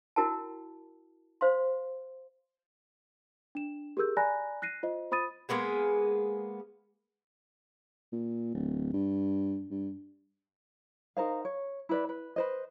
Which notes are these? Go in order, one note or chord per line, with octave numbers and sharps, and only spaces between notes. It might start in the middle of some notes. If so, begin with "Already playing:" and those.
E4 F#4 A#4 G5 A5
C5 F5 C6
D4 E7
G4 G#4 A#4 E6 G6
D5 G#5 A#5 B5 F#6 A#6
F#6 A#6 C7 D#7
F4 C5 D#5
F4 C5 B5 D#6 A6 D#7
G#3 A#3 B3 G#4
A#2
D1
G2
G2
D#4 A#4 C5 F5
C#5
E4 B4 D5
B4
B4 C5 D#5